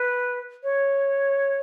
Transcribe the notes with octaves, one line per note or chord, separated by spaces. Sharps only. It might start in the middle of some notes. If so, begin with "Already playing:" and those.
Already playing: B4
C#5